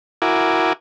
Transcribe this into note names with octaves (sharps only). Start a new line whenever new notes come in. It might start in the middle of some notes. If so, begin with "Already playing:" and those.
E4 F#4 A#4 G#5 D6